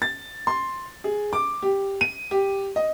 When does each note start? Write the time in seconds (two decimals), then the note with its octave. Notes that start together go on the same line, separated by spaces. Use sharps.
0.02 A6
0.47 C6
1.04 G#4
1.33 D6
1.62 G4
2.01 D#7
2.31 G4
2.76 D#5